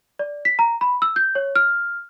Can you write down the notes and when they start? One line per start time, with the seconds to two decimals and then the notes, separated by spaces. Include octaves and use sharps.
0.19 D5
0.45 B6
0.59 A#5
0.81 B5
1.02 E6
1.16 G6
1.35 C#5
1.55 F6